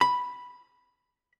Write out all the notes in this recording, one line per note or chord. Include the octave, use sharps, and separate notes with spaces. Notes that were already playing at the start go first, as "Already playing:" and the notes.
B5